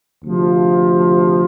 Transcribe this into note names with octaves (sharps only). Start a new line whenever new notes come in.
D2 C3 F3